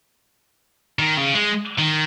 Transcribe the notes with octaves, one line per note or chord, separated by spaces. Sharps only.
D#3
C#3
G#3
D#3